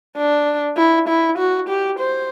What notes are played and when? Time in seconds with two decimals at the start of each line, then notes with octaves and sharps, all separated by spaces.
0.17 D4
0.77 E4
1.08 E4
1.38 F#4
1.69 G4
1.99 C5